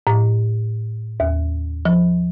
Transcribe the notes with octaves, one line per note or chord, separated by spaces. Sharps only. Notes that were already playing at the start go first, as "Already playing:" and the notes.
A2
D#2
F3